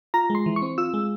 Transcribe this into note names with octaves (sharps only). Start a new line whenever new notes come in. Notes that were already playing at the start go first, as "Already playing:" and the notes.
F4 A#5
G#3
C6
E3
C#6
C4
F4 E6
G#3